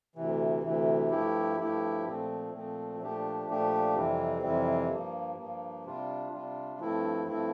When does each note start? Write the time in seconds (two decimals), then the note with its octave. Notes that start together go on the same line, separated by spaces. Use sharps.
0.16 D2 C3 E3
0.63 D2 C3 E3
1.10 G2 F3 A3 E4 G4
1.58 G2 F3 A3 E4 G4
2.05 A#2 F3 A3 C4
2.52 A#2 F3 A3 C4
2.99 A#2 F3 A3 D4 G4
3.47 A#2 F3 A3 D4 G4
3.94 F2 C3 E3 G3 C4
4.42 F2 C3 E3 G3 C4
4.90 G2 F3 A#3
5.37 G2 F3 A#3
5.85 C3 G3 D4 F4
6.31 C3 G3 D4 F4
6.80 G2 F3 A3 C4 E4
7.27 G2 F3 A3 C4 E4